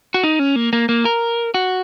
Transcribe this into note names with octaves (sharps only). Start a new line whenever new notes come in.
F#4
D#4
C#4
A#3
A#3
A#3
A#4
F#4